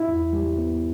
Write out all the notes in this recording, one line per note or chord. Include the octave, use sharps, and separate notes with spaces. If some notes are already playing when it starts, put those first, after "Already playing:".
Already playing: E4
E2
G3
B3